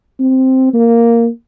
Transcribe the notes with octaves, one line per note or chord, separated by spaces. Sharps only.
C4
A#3